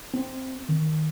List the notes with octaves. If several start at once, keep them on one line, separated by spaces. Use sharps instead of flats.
C4
D#3